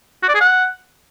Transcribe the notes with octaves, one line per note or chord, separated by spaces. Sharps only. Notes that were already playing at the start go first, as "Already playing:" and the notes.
F#4
D5
G#4
F#5